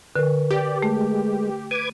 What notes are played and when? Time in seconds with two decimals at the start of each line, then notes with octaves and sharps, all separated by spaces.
0.16 D3 A#4 B4
0.51 G4 D5
0.82 G#3 A3
1.71 B4 D6 G#6 D#7